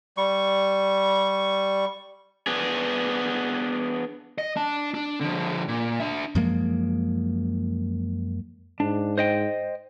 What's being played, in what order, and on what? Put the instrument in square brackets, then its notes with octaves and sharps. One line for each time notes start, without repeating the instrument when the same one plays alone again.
[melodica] G3 C#6
[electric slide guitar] B3 D4 G#4
[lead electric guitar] D#5
D4 A5
D4
D3 F3
A#2
D4 E5
[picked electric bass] F#2 F3 G#3 A#3
[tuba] G#2 [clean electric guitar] D4
[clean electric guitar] C5 D#5 G5